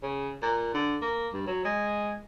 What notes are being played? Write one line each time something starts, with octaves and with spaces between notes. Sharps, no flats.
C#3
A#2
D3
A#3
G2
F#3
G#3